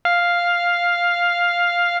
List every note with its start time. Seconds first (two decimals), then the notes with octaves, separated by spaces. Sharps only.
0.05 F5 F6